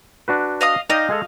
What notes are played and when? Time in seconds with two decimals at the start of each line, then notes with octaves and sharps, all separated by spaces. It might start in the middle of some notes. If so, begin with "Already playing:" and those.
0.28 D4 F#4 B4
0.61 D#5 F5 D#6
0.90 D#4 D5 D#5 F5 G5
1.09 G#3 G#4 A4